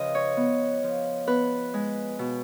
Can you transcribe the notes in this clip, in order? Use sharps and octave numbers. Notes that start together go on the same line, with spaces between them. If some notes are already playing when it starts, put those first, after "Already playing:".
Already playing: C#3 F3 B4 D#5
C#5
B3
F3
B3 B4
G#3
B2